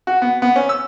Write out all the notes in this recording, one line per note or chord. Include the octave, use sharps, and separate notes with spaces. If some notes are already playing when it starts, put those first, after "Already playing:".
F#4
B3
B3
C#4
E6